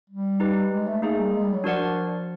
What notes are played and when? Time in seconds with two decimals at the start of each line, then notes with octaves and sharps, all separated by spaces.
0.10 G3
0.40 D#4 G4 B4
0.71 G#3
0.87 A3
1.02 A3 A#3 D#4 G#4
1.18 G3
1.33 G#3
1.44 G3
1.54 F#3
1.64 F3 D4 F#4 A#4 D5 F#5